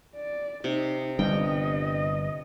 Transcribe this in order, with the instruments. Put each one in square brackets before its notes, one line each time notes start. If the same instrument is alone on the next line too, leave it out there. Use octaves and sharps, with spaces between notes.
[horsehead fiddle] D5
[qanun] C3 [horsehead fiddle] D#4
[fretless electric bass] G1 G2 [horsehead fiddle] D#5 [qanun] G5